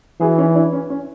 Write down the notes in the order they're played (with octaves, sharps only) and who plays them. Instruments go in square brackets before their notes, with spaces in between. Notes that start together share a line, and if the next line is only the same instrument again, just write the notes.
[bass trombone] E3 [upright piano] F#4 G#4
[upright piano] C#4 D#4
D4 E4
C#4
C#4